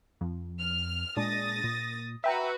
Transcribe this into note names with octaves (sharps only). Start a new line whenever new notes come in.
F2
F6
A#2 G#3 D4 D#6 A6 A#6
A#2
F#4 B4 E5 G5 A#5